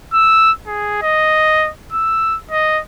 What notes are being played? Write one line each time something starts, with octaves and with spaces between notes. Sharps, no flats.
E6
G#4
D#5
E6
D#5